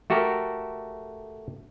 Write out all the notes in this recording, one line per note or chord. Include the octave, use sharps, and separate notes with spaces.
A3 F#4 G4 A4 A#4